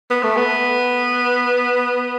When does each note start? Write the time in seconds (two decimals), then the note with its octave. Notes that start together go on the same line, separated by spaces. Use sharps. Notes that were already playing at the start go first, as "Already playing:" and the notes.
0.10 B3
0.23 A3
0.37 B3